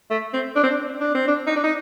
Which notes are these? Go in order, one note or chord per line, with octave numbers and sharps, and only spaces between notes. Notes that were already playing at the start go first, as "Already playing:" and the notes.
A3
C4
D4
C4
D4
D4
C4
D4
D#4
D4
D#4